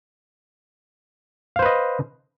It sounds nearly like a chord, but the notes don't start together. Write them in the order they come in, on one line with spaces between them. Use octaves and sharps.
F5 C5 B4 D#5